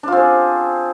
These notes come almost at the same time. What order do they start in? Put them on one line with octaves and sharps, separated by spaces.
D4 F4 C4 G#4